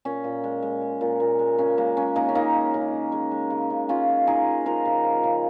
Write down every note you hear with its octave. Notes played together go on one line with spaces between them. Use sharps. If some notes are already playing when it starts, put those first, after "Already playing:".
A#2 C#4
A#2
G#3
G#3
G#3
A#2
A#2
G#3
C#3 C#4
G#3 A#3
G#3 C#4
C#3 A#3 D#4
C#4
C#3 A#3 D#4
G#3
C#3
C#3
G#3
G#3
C#3
C#3
G#3 C#4 F4
G#3
G#3 D#4 G#4
G#3
F3 F4 A#4
C#3
F3
C#3